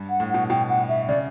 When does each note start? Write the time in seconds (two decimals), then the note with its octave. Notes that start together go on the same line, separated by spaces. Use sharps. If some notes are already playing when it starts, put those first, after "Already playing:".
Already playing: G2
0.10 F#5
0.20 A2
0.30 B2 F#5
0.49 B2 G5
0.69 F#5
0.89 E5
1.08 C#3 D5